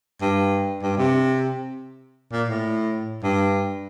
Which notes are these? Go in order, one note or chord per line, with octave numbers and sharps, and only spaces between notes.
G2
G2
C3
A#2
A2
G2